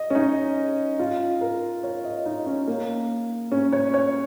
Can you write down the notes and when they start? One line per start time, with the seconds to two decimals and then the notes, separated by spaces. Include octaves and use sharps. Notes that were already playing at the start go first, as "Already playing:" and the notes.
Already playing: D#5
0.10 C#4
0.15 D#4
0.99 F4
1.41 A#4
1.83 C#5
2.04 D#5
2.26 D#4
2.46 C#4
2.68 A#3
3.52 C#4
3.73 C#5
3.94 C#5